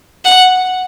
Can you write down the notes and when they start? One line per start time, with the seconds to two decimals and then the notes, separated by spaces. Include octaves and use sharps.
0.25 F#5